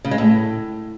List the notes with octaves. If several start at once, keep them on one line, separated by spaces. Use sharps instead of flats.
C#3
G#3
A2